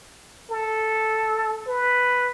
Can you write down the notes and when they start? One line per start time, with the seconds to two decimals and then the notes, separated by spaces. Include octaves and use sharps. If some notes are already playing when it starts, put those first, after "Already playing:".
0.51 A4
1.68 B4